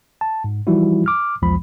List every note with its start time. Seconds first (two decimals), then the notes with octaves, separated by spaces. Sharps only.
0.21 A5
0.44 G#2
0.67 E3 F3 G3 D#4 E4 F#4
1.06 D6 F6
1.42 B1 E2 F3 G#3 B5